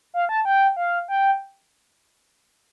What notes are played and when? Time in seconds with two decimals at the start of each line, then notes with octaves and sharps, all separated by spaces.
0.14 F5
0.29 A5
0.45 G5
0.76 F5
1.08 G5